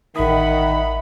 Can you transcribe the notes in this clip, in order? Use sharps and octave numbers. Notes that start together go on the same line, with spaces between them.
A1 D#3 E5 F#5 B5 D#6